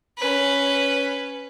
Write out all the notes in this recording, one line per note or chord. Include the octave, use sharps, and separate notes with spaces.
C#4 B4